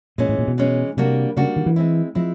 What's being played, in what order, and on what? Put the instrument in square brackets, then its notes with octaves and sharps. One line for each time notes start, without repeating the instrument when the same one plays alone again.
[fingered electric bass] A#2 [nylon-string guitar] E3 G#3 C#4
[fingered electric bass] A2
A#2
B2
[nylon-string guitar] E3 G#3 C#4
[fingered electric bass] C3 [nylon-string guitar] G3 A#3 D4 F#4
[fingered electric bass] C#3 [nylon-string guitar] G3 A#3 D4 F#4
[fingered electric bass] D#3
E3
[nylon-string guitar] G#3 C4 E4
[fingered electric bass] F3 [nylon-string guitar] G#3 C4 E4